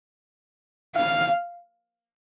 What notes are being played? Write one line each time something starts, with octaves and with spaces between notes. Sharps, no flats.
F5